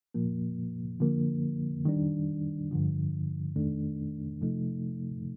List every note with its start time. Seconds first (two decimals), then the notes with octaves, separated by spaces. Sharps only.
0.14 A#2 F3 A#3
1.00 D3 F3 A#3
1.85 D#3 G3 D4
2.71 G2 D3 F3
3.56 F2 D#3 A3 D4
4.41 C3 F3 A3 D#4